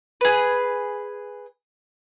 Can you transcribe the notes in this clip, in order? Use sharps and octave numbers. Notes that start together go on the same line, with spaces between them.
G#4 B4